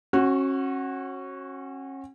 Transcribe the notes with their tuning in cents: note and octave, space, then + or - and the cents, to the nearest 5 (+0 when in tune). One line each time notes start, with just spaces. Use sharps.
C#4 -35 F#4 +0